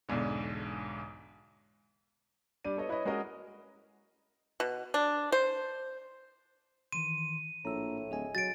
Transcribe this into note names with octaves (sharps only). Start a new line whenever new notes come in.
B1 E2 G#2 D3
G3 D4 D5 D#7
B3 A4 C#5 D#5
E4 B4 C#5 D#5
G#3 C#4 F#4 A#4 D#5
B2
D4
C5
D#3 E3 C6 D#7
A#1 A2 A#5 E6
D1 G#4 D#5 G#5
F#3 A6 D7